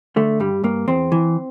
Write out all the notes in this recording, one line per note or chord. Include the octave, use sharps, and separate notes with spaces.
D3 A3
G2 G3
G2 A#3
E2 C4
E3